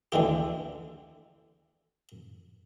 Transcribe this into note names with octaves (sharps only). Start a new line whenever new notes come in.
D2 D3 E3 G4